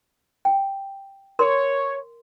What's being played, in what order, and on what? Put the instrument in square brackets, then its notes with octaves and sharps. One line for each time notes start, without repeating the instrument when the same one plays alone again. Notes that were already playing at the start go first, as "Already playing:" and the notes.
[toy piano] G5
[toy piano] A#4 C6 [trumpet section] C#5